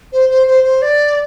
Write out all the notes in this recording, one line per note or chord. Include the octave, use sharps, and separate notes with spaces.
C5
C5
C5
C5
D5